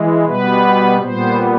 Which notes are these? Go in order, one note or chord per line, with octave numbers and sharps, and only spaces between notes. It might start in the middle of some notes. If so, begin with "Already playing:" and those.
Already playing: E3 G#3
B2 G3 B3 B4
A#2 G3 B3 C5